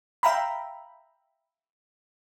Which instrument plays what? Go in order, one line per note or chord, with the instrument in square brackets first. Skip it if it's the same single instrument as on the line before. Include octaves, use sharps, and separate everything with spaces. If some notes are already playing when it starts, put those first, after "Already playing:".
[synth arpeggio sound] E5 F5 G5 A#5 B5